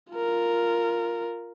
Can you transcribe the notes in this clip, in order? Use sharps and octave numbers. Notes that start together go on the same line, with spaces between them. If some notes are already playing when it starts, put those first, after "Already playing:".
F4 A#4